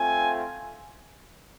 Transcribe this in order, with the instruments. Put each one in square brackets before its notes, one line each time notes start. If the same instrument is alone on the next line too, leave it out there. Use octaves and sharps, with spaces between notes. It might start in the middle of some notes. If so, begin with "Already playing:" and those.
Already playing: [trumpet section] A3 C4 F4 G#5